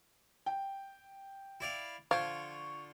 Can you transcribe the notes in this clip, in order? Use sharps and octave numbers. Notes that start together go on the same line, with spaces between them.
G5
E4 D5 F5
D3 F3 F4 F5 C#6 G#6